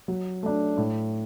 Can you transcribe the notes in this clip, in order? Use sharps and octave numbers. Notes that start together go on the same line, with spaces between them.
F#3
A3 D4
A2